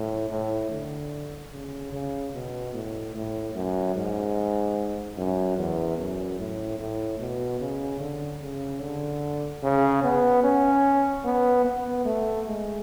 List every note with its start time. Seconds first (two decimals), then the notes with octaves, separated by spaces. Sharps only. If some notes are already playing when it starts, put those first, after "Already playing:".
Already playing: A2
0.30 A2
0.71 D3
1.52 C#3
1.92 C#3
2.33 B2
2.74 A2
3.15 A2
3.55 F#2
3.95 G#2
5.17 F#2
5.58 E2
5.98 F#2
6.39 A2
6.79 A2
7.20 B2
7.60 C#3
8.00 D3
8.41 C#3
8.81 D3
9.63 C#3
10.04 B3
10.44 C#4
11.25 B3
11.64 B3
12.05 A3
12.46 G#3